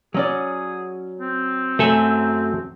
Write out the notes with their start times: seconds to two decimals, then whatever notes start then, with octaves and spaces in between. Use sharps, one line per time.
0.14 F#3 C#4 G#4 D5
1.20 C4
1.79 F#2 F#3 A3 A4 G#5